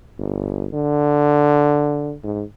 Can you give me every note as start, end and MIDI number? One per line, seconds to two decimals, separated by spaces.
0.19 0.68 31
0.74 2.13 50
2.24 2.43 44